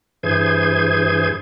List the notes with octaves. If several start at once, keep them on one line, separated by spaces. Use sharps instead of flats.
G2 E3 G#4 C5 G#6